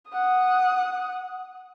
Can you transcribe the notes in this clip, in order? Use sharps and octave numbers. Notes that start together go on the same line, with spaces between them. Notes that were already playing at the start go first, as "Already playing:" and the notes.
F#5 D#6